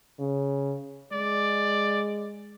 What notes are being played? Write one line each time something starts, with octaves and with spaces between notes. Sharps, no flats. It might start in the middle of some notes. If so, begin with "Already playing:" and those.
C#3
G#3 D5